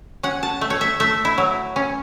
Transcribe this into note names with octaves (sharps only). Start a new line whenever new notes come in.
C#4 F#5
A5
A3
C#5
E5
A3 E5
E4
F#3
C#4